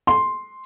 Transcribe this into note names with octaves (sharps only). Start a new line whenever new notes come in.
C6